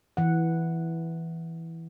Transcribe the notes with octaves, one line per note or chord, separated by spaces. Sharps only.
E3 F#5